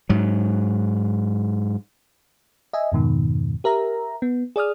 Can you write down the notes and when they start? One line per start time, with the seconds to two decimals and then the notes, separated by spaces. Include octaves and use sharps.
0.09 G#2 F#3
2.73 D#5 E5 G#5
2.92 F2 G#2 B2 D#3
3.64 G4 A#4 E5 A#5
4.22 B3
4.56 G#4 D5 D#6 F6